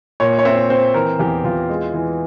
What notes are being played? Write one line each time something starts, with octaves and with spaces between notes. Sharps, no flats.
A#2 C#5
C#5
C4 E5
C4 C5
E3 A#4
E2 G4
E2 F4
G#3
E3